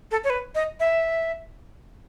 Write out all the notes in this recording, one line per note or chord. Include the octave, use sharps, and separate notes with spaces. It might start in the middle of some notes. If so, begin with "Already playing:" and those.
A4
C#5
B4
D#5
E5